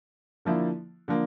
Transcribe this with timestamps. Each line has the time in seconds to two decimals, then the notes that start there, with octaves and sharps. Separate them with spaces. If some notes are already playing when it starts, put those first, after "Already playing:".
0.45 D3 F3 A#3 E4
1.08 D3 F3 A#3